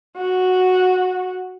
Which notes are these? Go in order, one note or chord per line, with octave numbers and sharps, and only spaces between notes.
F#4